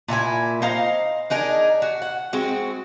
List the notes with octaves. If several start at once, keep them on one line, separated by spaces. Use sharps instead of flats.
A#2 E4 G#4 G#5
D#4 C5 F5 A#5
D4 D#4 G#4 A#4
F#4
F#5
G#3 C4 F#4